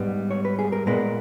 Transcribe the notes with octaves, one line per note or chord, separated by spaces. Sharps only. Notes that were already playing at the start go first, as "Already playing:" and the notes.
Already playing: G#2 G3 B3
C#5
B4
G#4
A#4
A#2 G#3 B3 A#4